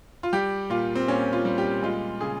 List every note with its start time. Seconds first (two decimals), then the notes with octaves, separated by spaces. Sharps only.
0.23 F4
0.33 G3 G4
0.70 A#2 F4
0.96 C4
1.08 A#2 C#4
1.33 F4
1.45 G3
1.58 G4
1.83 G#3 F4
2.21 C#3 G#4